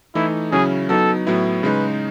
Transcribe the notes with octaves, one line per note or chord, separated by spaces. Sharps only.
E3 A3 D#4 E4
C#3 F#3 C#4 E4 G#4
F#3 B3 D#4 A4
A2 F#3 B3 E4
C#3 G#3 D#4 B4